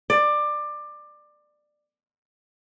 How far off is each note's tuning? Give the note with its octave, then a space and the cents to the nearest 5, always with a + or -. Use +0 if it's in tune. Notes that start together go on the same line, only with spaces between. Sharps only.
D5 +20